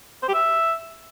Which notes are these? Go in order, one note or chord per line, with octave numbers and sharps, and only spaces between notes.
C5
G4
E5